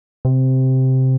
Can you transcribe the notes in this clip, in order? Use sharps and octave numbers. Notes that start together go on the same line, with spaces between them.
C3